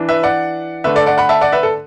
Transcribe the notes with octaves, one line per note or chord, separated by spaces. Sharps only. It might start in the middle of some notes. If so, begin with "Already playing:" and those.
Already playing: E3 D4
B4 E5
D5 F#5
D3 A3 D4 B4 E5
A4 D5
D5 F#5
F#5 B5
E5 A5
D5 F#5
B4 E5
A4